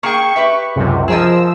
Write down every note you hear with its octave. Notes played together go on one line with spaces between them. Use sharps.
A#3 G#4 G5 C#6
G4 B4 E5
C#2 F#2 C3
F3 G#4 A#4 D#5 E6